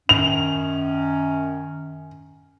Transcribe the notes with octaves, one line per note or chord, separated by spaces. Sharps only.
F#2 D#3 C#4 F7